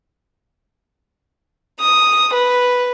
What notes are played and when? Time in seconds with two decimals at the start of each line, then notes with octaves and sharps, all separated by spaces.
1.80 D#6
2.34 B4